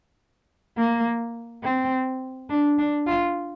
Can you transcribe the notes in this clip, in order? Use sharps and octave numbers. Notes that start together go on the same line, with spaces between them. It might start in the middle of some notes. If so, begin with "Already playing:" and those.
A#3
C4
D4
D4
F4